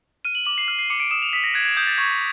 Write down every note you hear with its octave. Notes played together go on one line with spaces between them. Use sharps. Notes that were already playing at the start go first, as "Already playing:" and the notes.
F6 D#7
F#7
D6 F#7
C7
F6
C7
D6 C#7
D7
D#6 E7
F7
D#6 B6
A#6
F#6 G#6
G#6
D#6 G6
A6
C#6 G#6